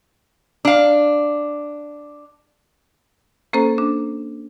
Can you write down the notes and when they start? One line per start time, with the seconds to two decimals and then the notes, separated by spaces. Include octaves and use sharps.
0.65 D4 F5
3.53 A#3 C#4 A4 C5 A#5
3.78 D4